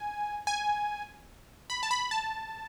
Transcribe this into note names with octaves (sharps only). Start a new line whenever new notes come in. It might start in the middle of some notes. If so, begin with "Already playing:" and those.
Already playing: G#5
G#5
B5
A5
B5
A5